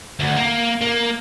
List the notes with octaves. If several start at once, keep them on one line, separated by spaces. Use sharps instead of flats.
D2
A#3
A#3